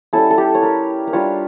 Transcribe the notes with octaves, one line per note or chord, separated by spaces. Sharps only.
G3 C#4 E4 A4
A4
G4
C#5
A#4
A#4
G3 D4 F4 C#5